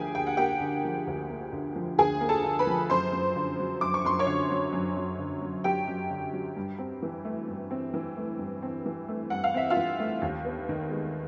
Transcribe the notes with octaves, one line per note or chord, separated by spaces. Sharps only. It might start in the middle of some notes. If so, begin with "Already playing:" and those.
Already playing: D2 D3 F3 A#3 G4 G#4 G5 G#5
D2 G5
F#5
A#3 G4 G5
D3
F3
D2
A#3
D3
F3
D2 G#4 G#5
A#3
A4 A5
D3
B4 B5
F3
F#2 C5 C6
F#2
D3
F#3
F#2 D6
C#6
F#2 C6
C#5 C#6
D3
F#3
F#2
F#2
D3
F#3
F#2 G4 G5
F#2
D3
F#3
G2
C4
E3
A3
G2
C4
E3
A3
G2
C4
E3
A3
G2 F#5
F5
C4 E5
F4 F5
E3
A3
D#2
B3
D#3
G#3